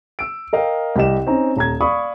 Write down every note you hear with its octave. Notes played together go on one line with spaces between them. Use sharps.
E6 D7
A#4 D#5 F5 G5
C2 C3 G4 D#5 E7
C4 C#4 D#4 A#5
D#1 A#5 G#6
D5 F5 B5 C#6 D#6